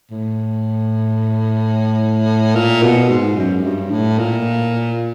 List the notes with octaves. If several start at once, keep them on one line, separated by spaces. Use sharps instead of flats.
A2
A#2
B2
G#2
F#2
G2
A2
A#2